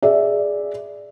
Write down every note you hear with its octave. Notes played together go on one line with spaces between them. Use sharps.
G#4 D5 E5